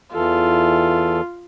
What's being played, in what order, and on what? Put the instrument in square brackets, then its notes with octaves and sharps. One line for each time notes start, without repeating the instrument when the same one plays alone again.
[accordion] E2 E3 A4 [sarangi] F4